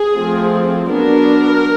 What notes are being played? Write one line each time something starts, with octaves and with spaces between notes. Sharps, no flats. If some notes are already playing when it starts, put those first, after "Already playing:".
Already playing: G#4
F3 A3 C4
F#3 B3 D4 A#4